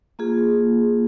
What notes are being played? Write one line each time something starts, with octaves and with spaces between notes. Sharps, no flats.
A#3 F4 G#4